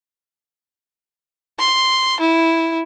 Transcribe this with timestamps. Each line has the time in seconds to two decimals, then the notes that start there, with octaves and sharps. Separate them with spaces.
1.59 C6
2.20 E4